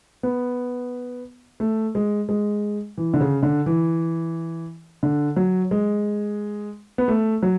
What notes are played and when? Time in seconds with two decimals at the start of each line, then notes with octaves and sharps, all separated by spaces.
0.23 B3
1.60 A3
1.95 G#3
2.29 G#3
2.98 E3
3.14 D3
3.21 C#3
3.43 D3
3.66 E3
5.03 D3
5.36 F#3
5.71 G#3
6.98 B3
7.08 A3
7.43 F#3